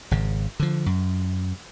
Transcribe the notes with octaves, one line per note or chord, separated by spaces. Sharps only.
G#1 C#3
D3 F3
F#2